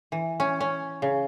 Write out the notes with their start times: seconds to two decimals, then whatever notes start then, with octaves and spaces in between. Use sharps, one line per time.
0.12 E3
0.40 C#4
0.60 C#4
1.02 C#3